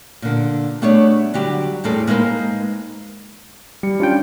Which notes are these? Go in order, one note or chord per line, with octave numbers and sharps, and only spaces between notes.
A#2 D3
G3 A3 B3 D4 G#4 C#5
D3 F#3 G3 F#4 G4
E2 A2 G3 C4 G#4 A4
G#3 A#3 D#4 B4 C5
G3 C#7
G3 C#4 D4 F4 G5